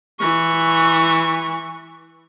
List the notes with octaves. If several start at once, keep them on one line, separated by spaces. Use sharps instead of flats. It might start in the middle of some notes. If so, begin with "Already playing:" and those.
E3 C#6